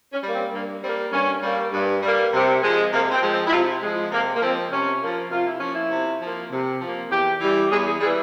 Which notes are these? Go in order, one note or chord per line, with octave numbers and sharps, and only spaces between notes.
C#4
G3 A#3
C4
G2 A#3
G3 A#3 C4
G2 C#4
G3 A#3
G2
G3 A#3
C3
F3 G#3
C3 A#3
C4
F3 G#3
C4
E4
C3 F4
F3 G#3
C3 A#3
A#3
F3 G#3 C4
C3 C#4
F3 A#3
C3 F4
E4
F3 A#3 C#4
E4
C3
F3 A#3
C3
F3 A#3
E2 G4
E3 G3
E2 G#4
G#4
E3 G3 G#4